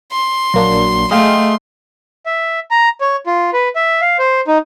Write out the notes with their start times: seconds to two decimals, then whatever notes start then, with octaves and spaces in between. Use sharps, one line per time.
0.12 C6
0.54 A#1 F#3 A#3 D4
1.11 A3 G#4 D#5 F5 G5 C6 D#6
2.26 E5
2.71 A#5
3.01 C#5
3.26 F4
3.53 B4
3.76 E5
4.01 F5
4.19 C5
4.47 D#4